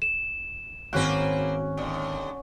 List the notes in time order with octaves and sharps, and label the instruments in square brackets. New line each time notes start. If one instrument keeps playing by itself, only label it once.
[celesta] E7
[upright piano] G#1 F#6 [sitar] A#3 C4 B4 [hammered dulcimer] C#4 F#4
[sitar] D#2 D3